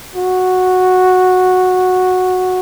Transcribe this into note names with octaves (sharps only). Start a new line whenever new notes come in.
F#4